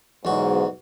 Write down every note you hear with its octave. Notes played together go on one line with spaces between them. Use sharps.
B1 E2 G#2 F#4